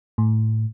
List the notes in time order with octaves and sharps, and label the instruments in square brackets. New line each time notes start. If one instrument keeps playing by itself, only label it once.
[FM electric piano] A2